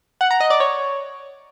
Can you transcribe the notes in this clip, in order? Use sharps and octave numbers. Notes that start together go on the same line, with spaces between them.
F#5
A#5
D#5
D5
C#5